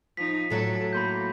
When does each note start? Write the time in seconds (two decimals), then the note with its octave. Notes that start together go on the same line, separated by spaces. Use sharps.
0.17 F3 D#4 B6
0.50 A2 F#3 A3 A4
0.93 A#3 B5 C6 G6